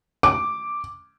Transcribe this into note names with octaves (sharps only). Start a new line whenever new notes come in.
D6